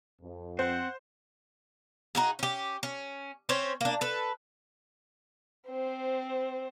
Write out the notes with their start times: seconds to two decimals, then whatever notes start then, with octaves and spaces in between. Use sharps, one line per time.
0.21 F2
0.59 C4 C5 F#5
2.15 D#4 F#4 G#4
2.39 C#4 G4
2.83 C#4
3.49 C4 C#4 C5 C#5
3.81 A#3 D4
4.01 A4 B4
5.68 C4 C5